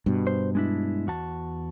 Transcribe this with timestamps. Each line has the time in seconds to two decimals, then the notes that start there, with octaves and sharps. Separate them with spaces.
0.06 G2 B2
0.27 C5
0.55 G#3 D4 E4
1.07 E2 F#4 A5